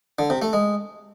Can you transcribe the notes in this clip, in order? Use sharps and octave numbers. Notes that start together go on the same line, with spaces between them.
D3
C3
A3
G#3